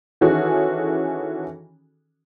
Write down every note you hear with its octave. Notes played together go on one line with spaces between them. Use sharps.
D#3 E3 C#4 F#4 G#4 A4